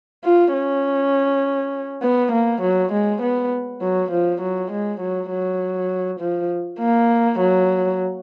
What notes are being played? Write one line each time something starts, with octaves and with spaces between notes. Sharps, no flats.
F4
C#4
B3
A#3
F#3
G#3
B3
F#3
F3
F#3
G#3
F#3
F#3
F3
A#3
F#3